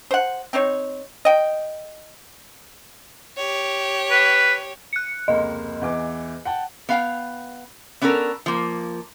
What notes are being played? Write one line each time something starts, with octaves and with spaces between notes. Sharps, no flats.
C5 F#5
C4 D#4 C5 C#5
D#5 G5
G4 C#5
B4
F#6 C#7
F1 C#2 A#3 D#5
E2 E3 D6
F#5 G5 A5
B3 F5 G5
B3 C#4 D4 A4 A#4
F3 A#3